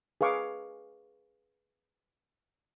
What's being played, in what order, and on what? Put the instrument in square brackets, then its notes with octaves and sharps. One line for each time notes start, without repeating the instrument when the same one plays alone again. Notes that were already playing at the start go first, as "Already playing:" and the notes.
[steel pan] G#4 B4 F5 C#6 D6